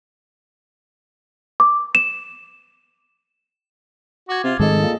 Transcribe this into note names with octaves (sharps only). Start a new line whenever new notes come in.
D6
E7
F#4 D6 G#6
C3 F4
F1 G#2 D#3 G#4 A4 D#5
A#2